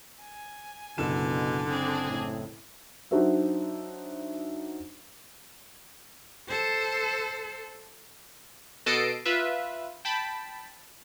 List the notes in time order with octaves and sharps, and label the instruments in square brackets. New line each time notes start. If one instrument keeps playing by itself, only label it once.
[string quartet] G#5
[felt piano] F#1 E7 [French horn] B2 [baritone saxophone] D3
[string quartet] C4 D4 G#4
[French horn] A2
[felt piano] F#3 D4 D#4 F#4 C5 E5
[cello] A4 C5
[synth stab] B2 A4 D#5 A5 C7 D7
F4 B4 E5
G5 A5 B5